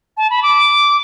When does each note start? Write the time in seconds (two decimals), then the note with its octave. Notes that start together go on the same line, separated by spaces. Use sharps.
0.17 A5
0.30 B5
0.43 D6